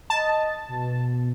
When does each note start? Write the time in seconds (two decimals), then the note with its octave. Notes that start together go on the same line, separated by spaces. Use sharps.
0.10 D#5 A5
0.68 B2